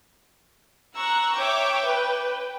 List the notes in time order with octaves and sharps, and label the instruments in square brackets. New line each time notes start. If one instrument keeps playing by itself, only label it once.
[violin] A#5 E6 [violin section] C#6 F#6
[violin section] C#5 E5 D6 [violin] G5
[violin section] B4